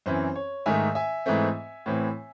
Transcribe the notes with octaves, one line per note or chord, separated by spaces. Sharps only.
F#2 E3 C4 C5
C#5
G#2 D#3 A3 E5 G#5
E5 G#5
G#2 E3 A3 C4
A2 E3 C4